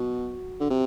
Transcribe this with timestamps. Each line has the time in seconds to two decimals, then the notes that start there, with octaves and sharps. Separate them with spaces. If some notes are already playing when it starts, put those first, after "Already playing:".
Already playing: B2 F#4
0.60 D3
0.70 C3